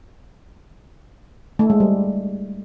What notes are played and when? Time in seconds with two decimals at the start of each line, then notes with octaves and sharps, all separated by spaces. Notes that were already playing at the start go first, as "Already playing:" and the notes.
1.59 A3
1.70 G#3
1.80 G3